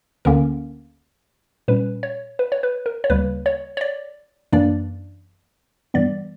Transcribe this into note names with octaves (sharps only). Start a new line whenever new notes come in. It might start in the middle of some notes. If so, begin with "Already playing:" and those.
D2 D3 A#3 C#4 A#4
A#2 G3 C#4 B4
C#5
B4
C#5
B4
A#4
C#5
D2 C#3 G3 A#3 B4
C#5
C#5
D5
F#2 E3 A#3 D4 D5
G2 E3 G3 B3 D5